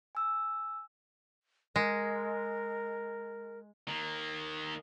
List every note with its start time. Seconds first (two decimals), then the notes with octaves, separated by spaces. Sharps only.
0.15 G#5 E6
1.76 G#3 A#4
3.88 D#3 A#3